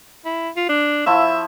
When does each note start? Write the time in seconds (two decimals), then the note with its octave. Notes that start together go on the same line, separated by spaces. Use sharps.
0.25 E4
0.56 F4
0.69 D4
1.06 F3 E4 E5 C#6